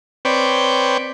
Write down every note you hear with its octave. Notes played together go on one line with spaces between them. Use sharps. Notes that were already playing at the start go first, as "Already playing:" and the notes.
C4 B4 C#5 D5 G5